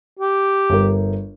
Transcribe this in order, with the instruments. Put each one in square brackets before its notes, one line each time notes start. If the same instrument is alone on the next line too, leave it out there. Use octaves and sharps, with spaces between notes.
[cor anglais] G4
[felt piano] G1 A#4